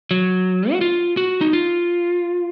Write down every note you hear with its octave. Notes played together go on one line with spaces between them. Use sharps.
F#3
F#4
F4
F#4
D#4
F4